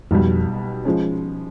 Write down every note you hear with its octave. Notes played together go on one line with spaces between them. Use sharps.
B1 F2 B2 G3
F3 G#3 C#4